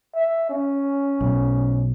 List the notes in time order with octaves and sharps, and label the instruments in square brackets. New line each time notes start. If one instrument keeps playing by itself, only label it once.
[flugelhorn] E5
C#4
[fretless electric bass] B1